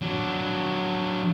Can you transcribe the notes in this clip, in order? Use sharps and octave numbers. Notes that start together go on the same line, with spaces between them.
F#3 D4